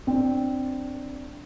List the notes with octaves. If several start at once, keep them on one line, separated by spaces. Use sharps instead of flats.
C4 D4